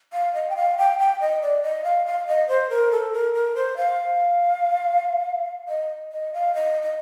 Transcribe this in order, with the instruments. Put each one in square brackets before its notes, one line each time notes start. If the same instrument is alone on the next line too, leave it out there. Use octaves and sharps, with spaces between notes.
[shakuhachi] F5
D#5
G5
F5
G5
G5
D#5
D5
D#5
F5
F5
D#5
C5
A#4
A4
A#4
A#4
C5
F5
D#5
D#5
F5
D#5
D#5